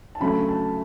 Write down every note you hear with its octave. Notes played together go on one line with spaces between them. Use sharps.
A5
D2 C#3 F#3 A3 B5
A5